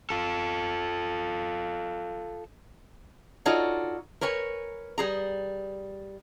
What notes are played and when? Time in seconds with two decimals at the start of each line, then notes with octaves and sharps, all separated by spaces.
0.10 F4 A4
3.45 D#4 F4 F#4 A4 C#5 D5
4.21 A#4 B4 C#5 G#5
4.98 G3 G#4 A#5